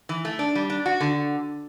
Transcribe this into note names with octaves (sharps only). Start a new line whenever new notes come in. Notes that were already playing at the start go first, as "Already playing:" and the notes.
E3
A3
D4
G3
D4
F#4
D3